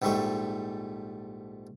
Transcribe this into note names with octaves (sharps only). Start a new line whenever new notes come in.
A#1 G#2 G3 A3 D#4 C#6